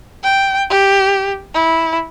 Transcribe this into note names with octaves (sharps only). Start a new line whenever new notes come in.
G5
G4
E4